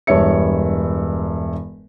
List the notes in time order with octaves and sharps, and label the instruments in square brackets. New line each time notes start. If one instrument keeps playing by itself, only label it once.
[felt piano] E1 G2 C#5 E5 C#7